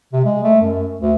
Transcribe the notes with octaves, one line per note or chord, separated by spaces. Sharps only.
C3
G#3
A3
F#2
D2